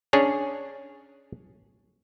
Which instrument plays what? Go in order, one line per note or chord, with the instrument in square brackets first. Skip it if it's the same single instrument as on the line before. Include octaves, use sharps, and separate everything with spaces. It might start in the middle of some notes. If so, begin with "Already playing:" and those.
[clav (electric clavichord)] C#4 D4 G#4 C#5